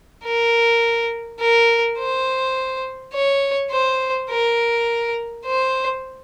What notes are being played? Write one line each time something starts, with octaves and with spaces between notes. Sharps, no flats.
A#4
A#4
C5
C#5
C5
A#4
C5